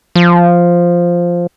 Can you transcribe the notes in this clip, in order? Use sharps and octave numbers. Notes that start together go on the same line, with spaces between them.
F3